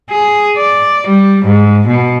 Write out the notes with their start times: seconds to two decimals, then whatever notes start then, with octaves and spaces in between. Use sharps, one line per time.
0.10 G#4
0.58 D5
1.07 G3
1.45 G#2
1.87 B2